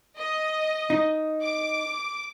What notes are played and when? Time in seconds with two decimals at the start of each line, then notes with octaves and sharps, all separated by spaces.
0.17 D#5
0.90 D#4
1.43 D6